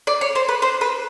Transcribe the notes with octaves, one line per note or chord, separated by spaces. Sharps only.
D5
C#5
C5
B4
C5
B4